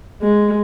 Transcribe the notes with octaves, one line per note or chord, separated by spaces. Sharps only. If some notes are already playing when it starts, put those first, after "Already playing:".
G#3